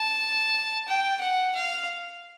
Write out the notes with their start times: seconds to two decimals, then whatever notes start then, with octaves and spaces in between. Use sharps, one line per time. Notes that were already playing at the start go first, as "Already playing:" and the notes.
Already playing: A5
0.88 G5
1.21 F#5
1.55 F5